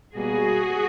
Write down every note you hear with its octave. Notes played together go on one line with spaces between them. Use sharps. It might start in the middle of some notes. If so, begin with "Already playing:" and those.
B2 G3 A#3 F#4 G#4